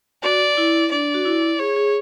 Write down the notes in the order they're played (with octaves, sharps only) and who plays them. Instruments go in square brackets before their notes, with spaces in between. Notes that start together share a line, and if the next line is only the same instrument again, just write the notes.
[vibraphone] F#4 [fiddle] D5
[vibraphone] E4
[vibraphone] D4 [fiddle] D5
[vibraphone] F#4
E4
[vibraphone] G#4 [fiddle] C#5
[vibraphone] G#4